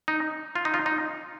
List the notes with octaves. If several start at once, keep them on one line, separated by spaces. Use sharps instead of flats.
D#4
F4
D#4
F4
D#4